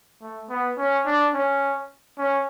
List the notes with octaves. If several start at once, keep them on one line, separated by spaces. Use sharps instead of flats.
A3
B3
C#4
D4
C#4
C#4